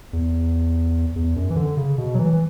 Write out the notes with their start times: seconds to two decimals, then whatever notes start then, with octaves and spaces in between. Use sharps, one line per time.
0.13 E2
1.16 E2
1.36 F#2
1.50 E3
1.56 D3
1.77 C#3
1.98 B2
2.15 F#3
2.19 E3
2.33 E3